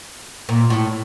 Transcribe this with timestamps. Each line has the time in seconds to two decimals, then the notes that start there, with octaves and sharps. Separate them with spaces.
0.49 A#2
0.70 A2